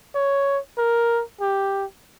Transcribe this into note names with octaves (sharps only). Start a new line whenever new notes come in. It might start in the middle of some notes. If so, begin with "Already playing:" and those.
C#5
A#4
G4